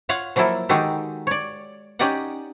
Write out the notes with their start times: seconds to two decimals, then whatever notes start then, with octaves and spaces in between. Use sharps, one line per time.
0.09 F4 C#5 F5 F#5
0.36 F3 F#3 A#3 E4 A4 A#4
0.69 D#3 G#3 D#4 F#4 G4 A4
1.27 C#5 D5
1.99 C#4 D#4 G4 D5 D#5 F#5